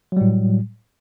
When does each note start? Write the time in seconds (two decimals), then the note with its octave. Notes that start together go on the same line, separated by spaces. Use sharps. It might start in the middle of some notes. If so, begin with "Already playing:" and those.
0.12 F#3
0.17 G3
0.21 A2